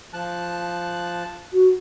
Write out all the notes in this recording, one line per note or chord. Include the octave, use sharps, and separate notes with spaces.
F3 A5 F#6
F#4